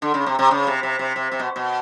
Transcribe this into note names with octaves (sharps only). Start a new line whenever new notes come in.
D3
C#3
C3
C3
C#3
C3
C3
C3
C3
C3
B2
B2